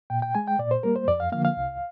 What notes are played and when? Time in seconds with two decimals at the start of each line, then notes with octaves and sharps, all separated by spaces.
0.10 A#2 G5
0.22 G5
0.35 G#3 G#5
0.47 G5
0.59 A#2 D5
0.71 C5
0.83 G3 A#3 A#4
0.96 C5
1.08 F2 D5
1.20 F5
1.32 D3 F3 A#3 F5
1.45 F5
1.57 C2